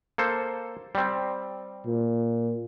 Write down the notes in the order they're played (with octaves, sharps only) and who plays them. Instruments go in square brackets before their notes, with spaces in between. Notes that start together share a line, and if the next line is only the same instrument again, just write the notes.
[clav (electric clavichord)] A#3 A4 C5
G3 C4
[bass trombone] A#2